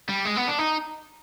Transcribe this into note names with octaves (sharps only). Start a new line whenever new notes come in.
G3
G#3
B3
D4
D#4